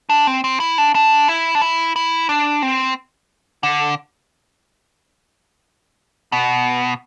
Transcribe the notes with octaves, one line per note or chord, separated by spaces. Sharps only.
D4
C4
C4
E4
D4
D4
E4
D4
E4
E4
D4
C4
D3
B2